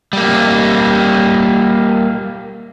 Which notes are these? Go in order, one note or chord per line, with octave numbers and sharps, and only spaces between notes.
G3 A#3